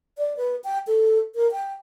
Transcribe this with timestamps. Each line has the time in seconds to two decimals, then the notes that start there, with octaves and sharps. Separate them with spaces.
0.18 D5
0.37 B4
0.64 G5
0.87 A4
1.35 A#4
1.52 G5